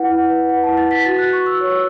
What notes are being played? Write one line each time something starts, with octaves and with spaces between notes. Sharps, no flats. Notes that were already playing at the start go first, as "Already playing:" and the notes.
Already playing: E4 B4 F#5
E4
B4
B4 F#5
E4 A5
A6
B4 B6
F#4 A6
F#4 F#6
C#6
F#4 E6
C#5 C#6
E6